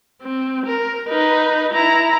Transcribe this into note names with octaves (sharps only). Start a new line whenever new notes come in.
C4
A#4
D#4 B4
E4 A#5